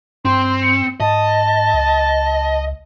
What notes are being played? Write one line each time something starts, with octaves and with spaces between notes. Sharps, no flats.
G2 C4 C6
C#7
G#2 D#5 A5
C#2